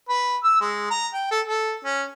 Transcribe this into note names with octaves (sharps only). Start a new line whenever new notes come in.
B4
E6
G#3
A#5
G5
A4
A4
C#4